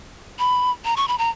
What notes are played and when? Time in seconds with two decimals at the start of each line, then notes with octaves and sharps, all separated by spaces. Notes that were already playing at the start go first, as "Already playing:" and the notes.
0.39 B5
0.85 A#5
0.97 C#6
1.08 B5
1.18 A#5